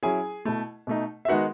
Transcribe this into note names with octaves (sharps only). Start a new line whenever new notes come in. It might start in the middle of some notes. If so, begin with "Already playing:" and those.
F#3 C#4 E4 G#4 G#5
B2 A3 E4
B2 A3 D#4
E5
D#3 G#3 B3 D#4 F#4 F#5